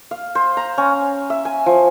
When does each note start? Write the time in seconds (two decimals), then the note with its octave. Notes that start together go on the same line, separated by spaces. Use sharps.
0.11 F5
0.35 C5
0.57 A#5
0.78 C#4
1.30 E5
1.45 G#5
1.66 F3